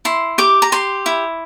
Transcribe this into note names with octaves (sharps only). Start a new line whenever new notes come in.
E4 C6
G4 D6
A#5
G4 C6
E4